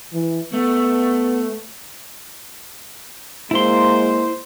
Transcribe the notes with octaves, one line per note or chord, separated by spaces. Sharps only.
E3
A3 B3
G#3 A#3 E4 C5 C6